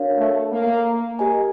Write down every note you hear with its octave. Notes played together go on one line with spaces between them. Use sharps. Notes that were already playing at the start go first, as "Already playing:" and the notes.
Already playing: D4 F#4 A#4 C#5 F5
A3
A#3
G4 A#4 D#5 G#5